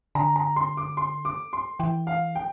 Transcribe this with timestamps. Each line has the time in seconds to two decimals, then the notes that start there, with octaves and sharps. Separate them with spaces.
0.15 D3 A#5
0.36 A#5
0.56 C6
0.77 D6
0.97 C6
1.25 D6
1.53 C6
1.79 E3 G5
2.07 F5
2.35 G5